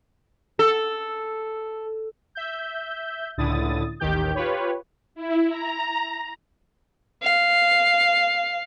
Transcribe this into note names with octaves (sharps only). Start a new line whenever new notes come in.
A4
E5 G6
C#2 A2 D3 E4 D#6 A6
A1 D#2 D#3 G4 G6
F4 G4 B4 C#5
E4
A#5
F5